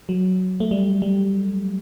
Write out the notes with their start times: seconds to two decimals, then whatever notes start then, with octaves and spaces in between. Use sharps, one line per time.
0.09 F#3
0.60 A3
0.71 G3
1.02 G3